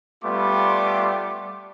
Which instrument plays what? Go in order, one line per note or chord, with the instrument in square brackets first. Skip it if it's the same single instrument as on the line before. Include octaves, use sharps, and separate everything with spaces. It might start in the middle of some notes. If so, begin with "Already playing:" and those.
[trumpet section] G3 A3 B3 F4 C6 D6